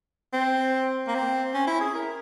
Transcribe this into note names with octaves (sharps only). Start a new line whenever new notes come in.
C4
A#3
C4
C#4
E4
G#4
A#4